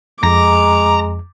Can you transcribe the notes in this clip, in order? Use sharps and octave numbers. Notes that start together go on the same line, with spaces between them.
F2 G#3 A#5 D6